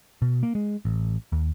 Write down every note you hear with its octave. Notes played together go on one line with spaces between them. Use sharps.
B2
A#3
G#3
A1
D#2